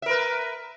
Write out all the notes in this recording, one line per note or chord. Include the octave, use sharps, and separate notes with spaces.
A#4 B4 E5